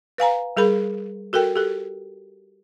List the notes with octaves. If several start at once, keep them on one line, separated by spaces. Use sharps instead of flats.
B4 F5 G#5 A#5
G3 G#4 A#4 B5
F#4 A4 A#4 G5
G4 A4